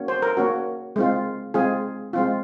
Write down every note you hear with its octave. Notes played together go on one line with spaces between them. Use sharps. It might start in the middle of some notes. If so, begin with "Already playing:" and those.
Already playing: A#3 C#4 F#4
C5
A#4
A#3 C#4 F#4
G#3 C4 F4
G#3 C4 F4 G#4
G#3 C4 F4